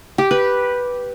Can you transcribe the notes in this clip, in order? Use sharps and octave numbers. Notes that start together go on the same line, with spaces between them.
G4
B4